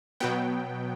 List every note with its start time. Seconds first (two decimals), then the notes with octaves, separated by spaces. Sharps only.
0.20 B2 F#3 B3 G5